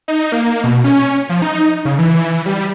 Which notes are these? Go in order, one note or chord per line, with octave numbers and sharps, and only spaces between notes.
D#4
A#3
B2
C#4
F3
D#4
C#3
E3
G3